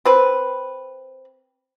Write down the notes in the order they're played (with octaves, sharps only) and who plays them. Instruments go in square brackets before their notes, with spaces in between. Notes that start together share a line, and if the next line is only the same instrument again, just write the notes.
[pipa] C4 B4